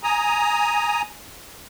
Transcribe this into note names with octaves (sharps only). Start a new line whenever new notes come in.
G#5 A#5 D#6